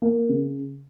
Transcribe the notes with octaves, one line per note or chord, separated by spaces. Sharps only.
A#3
C#3